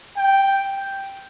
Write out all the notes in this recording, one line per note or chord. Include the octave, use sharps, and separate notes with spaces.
G5